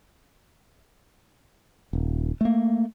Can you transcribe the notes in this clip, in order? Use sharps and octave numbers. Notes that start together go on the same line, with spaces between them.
D#1
A3 A#3